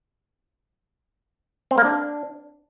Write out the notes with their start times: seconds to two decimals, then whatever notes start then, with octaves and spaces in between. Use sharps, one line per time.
1.71 C4
1.78 A#3
1.84 D4